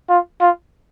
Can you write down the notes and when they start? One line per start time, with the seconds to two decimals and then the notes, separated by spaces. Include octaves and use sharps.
0.09 F4
0.41 F4